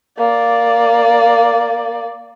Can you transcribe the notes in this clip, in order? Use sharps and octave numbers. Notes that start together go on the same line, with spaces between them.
A#3 D5